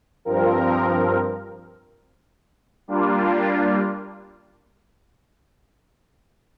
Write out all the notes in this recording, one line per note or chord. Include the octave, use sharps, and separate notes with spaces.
G2 F3 C4 A#4
G3 A#3 D4 F4